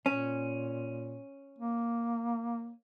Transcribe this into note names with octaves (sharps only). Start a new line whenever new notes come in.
A#2 C#4
A#3